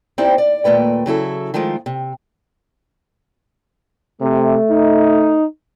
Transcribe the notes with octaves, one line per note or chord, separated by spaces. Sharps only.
C4 D#4 E4 G4 C5 D5
D5
D#2 A#2 A3 B4 G5
C#3 F#3 E4 A4
D#3 F3 G#3 A3 F4
C3
C3 A3
D#4